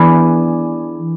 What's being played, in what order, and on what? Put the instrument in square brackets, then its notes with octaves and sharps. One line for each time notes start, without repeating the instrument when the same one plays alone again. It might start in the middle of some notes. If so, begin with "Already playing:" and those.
Already playing: [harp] E3 B3 D4 G#4